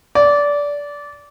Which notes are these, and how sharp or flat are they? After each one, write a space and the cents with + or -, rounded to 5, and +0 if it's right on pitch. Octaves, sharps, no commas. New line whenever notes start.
D5 -20